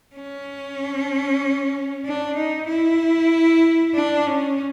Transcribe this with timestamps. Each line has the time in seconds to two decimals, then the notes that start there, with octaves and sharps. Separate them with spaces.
0.15 C#4
2.05 D4
2.37 D#4
2.68 E4
3.94 D4
4.27 C#4